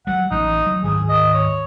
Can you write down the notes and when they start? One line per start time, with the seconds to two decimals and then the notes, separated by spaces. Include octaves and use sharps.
0.07 F#3 G3 F#5
0.31 A1 D#4
0.66 F#3
0.84 D2 G#2 D#3 G#4
1.09 D#5
1.34 C#5